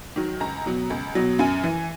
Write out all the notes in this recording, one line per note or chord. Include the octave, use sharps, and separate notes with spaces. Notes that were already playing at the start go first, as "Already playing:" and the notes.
D#3 F#3
C#2 A#5
B2 F#3
C#2
B2 F#3
F#2 G#5
E3